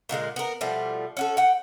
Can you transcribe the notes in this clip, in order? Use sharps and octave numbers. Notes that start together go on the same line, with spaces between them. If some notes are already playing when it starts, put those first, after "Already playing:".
A#2 D3 G#3 A#3
B3 A#4
B2 F3 G3 A3
C#4 F#4 A4
F#5 G5